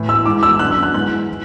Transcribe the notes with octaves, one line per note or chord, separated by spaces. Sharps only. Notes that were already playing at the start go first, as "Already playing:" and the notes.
Already playing: A2 E3
E6
G#2 E3 D6
E6
F#2 D3 F#6
E6
F#6
G#2 E3 F#6
E3